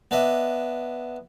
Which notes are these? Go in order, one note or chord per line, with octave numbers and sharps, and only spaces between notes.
B3 D4 D#5 E5